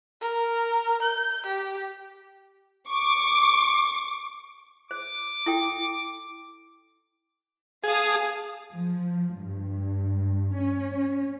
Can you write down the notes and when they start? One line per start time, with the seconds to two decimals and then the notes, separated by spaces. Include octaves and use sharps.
0.22 A#4
1.02 G6
1.46 G4
2.88 C#6 D6
4.91 C5 D6
5.46 E4 A4 G5
7.84 G#4 F5 A5 D#6
8.72 F3
9.37 G2
10.53 C#4